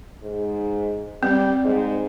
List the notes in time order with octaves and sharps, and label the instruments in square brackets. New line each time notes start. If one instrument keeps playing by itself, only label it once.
[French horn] G#2
[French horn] G3 [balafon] C4
[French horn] G#2